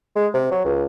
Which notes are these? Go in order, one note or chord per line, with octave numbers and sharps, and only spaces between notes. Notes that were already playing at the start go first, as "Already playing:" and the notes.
G#3
C3
F#3
C#2